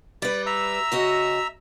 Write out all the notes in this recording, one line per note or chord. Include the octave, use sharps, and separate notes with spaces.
G3 B4 D5
E5 A#5 E6
C#3 F#4 D#5